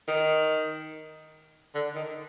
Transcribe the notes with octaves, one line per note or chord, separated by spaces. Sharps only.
D#3
D3
D#3